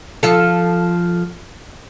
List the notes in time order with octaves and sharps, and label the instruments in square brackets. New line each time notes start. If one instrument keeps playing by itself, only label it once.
[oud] F3 F4 A4